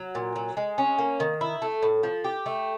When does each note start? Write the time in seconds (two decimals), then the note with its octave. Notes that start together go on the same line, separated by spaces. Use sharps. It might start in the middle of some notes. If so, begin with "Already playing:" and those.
Already playing: F#3
0.15 A#2
0.36 F#3
0.57 G#3
0.78 C#4
0.98 A#3
1.20 D#3
1.41 E4
1.62 A3
1.82 A2
2.03 F3
2.24 G4
2.46 A3